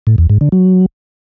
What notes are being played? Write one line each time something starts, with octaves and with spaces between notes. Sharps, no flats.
A2
E2
G#2
D3
F#3